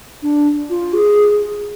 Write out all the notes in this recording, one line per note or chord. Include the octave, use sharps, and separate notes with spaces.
D4
F4
G#4